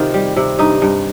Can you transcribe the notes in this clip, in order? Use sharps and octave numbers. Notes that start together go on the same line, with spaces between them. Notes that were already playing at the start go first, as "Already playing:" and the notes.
Already playing: C3 D#3 F4
G3
C3
G2 D#4
G2